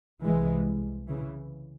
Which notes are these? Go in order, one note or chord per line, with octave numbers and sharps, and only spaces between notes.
C2 C3 E3 G#3
C#3 E3